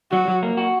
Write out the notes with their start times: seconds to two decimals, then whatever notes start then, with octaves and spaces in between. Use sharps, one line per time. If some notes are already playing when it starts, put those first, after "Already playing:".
0.11 F#3 F#4
0.28 F#3
0.43 A#3
0.57 F#4